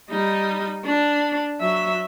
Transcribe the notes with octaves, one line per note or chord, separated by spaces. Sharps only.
G3 D#4
D4
F#3 E5